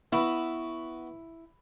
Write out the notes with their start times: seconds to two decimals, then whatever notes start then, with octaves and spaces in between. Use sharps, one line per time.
0.12 B3 E4 F#4 B4